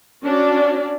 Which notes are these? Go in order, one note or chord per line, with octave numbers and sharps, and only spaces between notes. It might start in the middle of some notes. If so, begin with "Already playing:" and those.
C#4 D4 F#4 D5